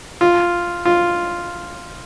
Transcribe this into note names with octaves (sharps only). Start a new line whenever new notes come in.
F4
F4